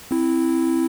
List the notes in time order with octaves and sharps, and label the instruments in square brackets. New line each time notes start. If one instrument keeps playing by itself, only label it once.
[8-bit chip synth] C4 E4